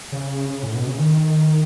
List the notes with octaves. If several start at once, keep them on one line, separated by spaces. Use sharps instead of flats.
C#3
A2
B2
C#3
D#3